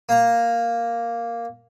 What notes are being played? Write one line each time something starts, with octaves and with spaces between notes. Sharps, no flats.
A#3 A#5